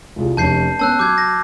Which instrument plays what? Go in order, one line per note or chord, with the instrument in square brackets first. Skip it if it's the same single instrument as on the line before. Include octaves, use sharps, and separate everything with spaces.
[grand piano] C2 F4 G#4
[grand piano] F1 C#4 [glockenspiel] A5 G6 C7
[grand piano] B3 C#4 C#5 [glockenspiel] A5 E6 F#6
[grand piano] F#3 [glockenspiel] D6 G6 G#6
[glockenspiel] A#6